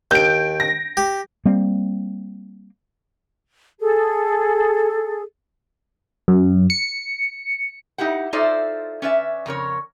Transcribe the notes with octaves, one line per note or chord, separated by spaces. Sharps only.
D#2 G6 D7
A#6
G4
G3 A#3 C4
G#4 A4
F#2
C#7
D#4 E4 G4 F#5
D#4 F4 A4 C5 D5 E5
C#4 B4 D5 E5
F2 C#3 A#4 C#5